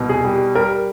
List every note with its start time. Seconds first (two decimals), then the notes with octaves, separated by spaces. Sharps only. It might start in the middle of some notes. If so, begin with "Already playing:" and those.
Already playing: C2 B2
0.09 G#4
0.25 G3
0.55 G3 A#4